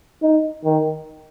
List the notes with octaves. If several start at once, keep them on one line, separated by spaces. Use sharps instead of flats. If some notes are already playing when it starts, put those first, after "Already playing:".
D#4
D#3